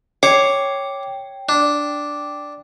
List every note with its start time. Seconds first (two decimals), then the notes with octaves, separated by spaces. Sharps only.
0.23 C#5 G5 D6
1.49 D4